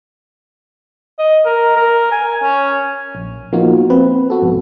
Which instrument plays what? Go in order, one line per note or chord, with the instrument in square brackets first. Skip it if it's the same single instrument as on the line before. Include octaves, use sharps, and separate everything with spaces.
[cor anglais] D#5
A#4
A#4
G#5
C#4
[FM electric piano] A#1
F3 A#3 B3 D#4 F4 F#4
C4 B4
B3 F#4 A4
B1 F2 G#2